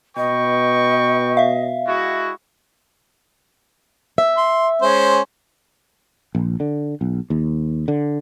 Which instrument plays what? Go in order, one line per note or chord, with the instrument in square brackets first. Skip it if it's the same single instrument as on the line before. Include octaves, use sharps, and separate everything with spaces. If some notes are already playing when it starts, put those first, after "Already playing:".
[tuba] B2 [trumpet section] B4 G5 C#6 [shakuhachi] D#5
[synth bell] E5 F5
[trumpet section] G#3 E4 F#4
[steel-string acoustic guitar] E5
[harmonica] C6
G#3 C#4 C5
[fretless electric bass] A#1
D3
B1
D#2
D3